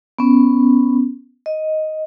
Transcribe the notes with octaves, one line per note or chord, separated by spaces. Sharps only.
B3 C#4
D#5